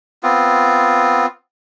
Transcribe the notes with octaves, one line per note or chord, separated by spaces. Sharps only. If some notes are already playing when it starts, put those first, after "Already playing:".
B3 C4 F4